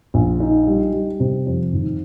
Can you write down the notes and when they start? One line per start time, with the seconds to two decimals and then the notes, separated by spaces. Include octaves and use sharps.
0.14 A#1
0.40 D#4
0.67 G3
0.93 G3
1.20 C3
1.46 F2
1.72 G#1